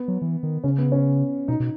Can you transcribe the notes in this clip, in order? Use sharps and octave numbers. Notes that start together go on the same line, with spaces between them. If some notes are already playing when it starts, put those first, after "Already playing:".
Already playing: B3
F#3
E3
D#3
C#3 C#4
B3
C#4
B2 D#4
B2